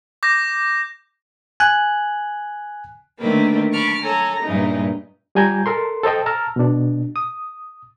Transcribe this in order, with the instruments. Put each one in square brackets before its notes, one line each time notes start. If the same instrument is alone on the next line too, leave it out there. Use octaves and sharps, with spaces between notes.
[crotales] D6 G6 A#6
[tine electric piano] G#5 F#6
[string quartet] D3 D#3 A3 A#3 C4 B4
A5 B5 C#6 D6 F6
A4 C#5 G#5 A#5
G2 A#2 C#3 E3 D#4
[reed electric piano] G3 F4 G#5 A#5 G6 G#6
A4 A#4 C6
A4 C5 D#5 G5
A5 A#5 E6 F6
B2 D4
D#6